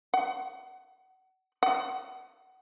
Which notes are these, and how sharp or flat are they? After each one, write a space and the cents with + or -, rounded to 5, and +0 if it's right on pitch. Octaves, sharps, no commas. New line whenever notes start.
F#5 +30
F#5 +25